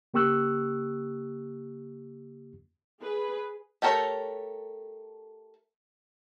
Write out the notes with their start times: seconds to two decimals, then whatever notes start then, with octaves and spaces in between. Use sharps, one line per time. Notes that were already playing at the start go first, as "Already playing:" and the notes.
0.14 C#3 A#3 G4 C#6 E6 F#6
3.00 G#4 B4
3.82 A3 G4 A4 A#4 C#5